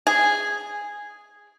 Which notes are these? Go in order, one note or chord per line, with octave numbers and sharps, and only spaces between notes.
G#4